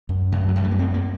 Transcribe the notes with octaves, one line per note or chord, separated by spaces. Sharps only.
F#2
F#2
F#3
F#2 G3
A3
A#3
F#2 C4
A#3